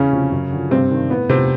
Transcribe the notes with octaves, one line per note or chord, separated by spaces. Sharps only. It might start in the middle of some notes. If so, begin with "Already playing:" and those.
Already playing: E2 C#3 C#4
C3 F3
F#2
D3 F3
G2 C3 C4
D#3
A2 B3
C3 F3 C4